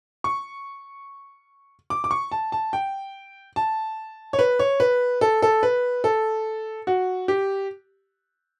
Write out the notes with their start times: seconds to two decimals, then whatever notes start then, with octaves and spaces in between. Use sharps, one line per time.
0.24 C#6
1.90 D6
2.04 D6
2.11 C#6
2.32 A5
2.52 A5
2.73 G5
3.56 A5
4.33 C#5
4.39 B4
4.59 C#5
4.80 B4
5.21 A4
5.42 A4
5.63 B4
6.04 A4
6.87 F#4
7.28 G4